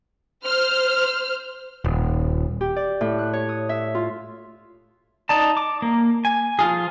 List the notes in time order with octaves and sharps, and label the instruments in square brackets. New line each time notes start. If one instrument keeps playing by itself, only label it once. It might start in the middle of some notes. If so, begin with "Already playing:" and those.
[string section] C5 F6
[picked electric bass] D#1
[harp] G4
D5
A2
F#6
C#5
D#6
E5
F4
[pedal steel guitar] D#4 D5 A5
D6
A#3
G#5
F3 F4 G#4